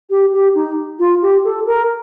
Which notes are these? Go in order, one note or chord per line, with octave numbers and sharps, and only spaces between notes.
G4
G4
D#4
F4
G4
A4
A#4